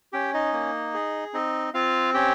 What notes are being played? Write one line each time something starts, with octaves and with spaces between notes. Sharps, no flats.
C#4 G4 G5
D#4 D#5
A#3
G#4
C4 D#4 D#5
C4 F4 F5
C#4 G4 G5